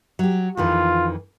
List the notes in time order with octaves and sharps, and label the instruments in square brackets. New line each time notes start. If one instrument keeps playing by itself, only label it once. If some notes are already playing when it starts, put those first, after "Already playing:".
[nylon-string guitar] F#3 G4
[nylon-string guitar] F2 D#3 E3 [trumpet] F4